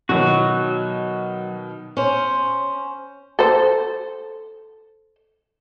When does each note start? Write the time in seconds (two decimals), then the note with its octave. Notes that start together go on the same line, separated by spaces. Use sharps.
0.09 B2 D#3 F#3 F#4
1.97 C#4 C5
3.39 A4 C5